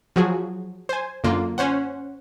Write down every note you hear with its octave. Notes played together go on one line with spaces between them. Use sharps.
F3 F#3 F#4 G#4
C5 G#5
F#2 D3 A#3 F4
C#4 C5 F#5